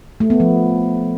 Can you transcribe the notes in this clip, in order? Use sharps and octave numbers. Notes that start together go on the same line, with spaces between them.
A3
B3
F3